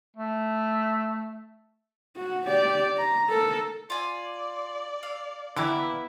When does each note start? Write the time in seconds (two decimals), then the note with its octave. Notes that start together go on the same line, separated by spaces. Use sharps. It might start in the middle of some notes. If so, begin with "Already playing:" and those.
0.17 A3
2.17 F#4
2.48 G4 D5
2.97 A#5
3.30 A4 A#4
3.90 F4 D5 G#5
5.03 F5
5.57 D3 E3 A#3 B3 E4 G4 D6